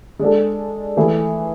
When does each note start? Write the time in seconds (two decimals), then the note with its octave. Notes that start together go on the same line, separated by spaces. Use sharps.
0.19 G#3 D4 A4
0.97 E3 A3 E4 G#4